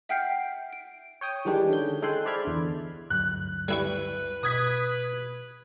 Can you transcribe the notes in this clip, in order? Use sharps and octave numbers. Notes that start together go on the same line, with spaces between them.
E5 F#5 G5 F6 G6 C7
D7
C#5 G5 D#6
D#3 E3 G3 G#3 D4 G4
D3 C#4 G6
G#3 A4 G5 G#5 C6 F#6
C5 D5 E5 B5 F6 G#6
E2 D3
D2 G2 F#3 F#6
G3 E4 B4 C#6
B2 B4 D#6 G#6 B6